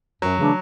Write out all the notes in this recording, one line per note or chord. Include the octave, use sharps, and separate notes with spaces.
F#2 F#3
C#3 E3 A3 D4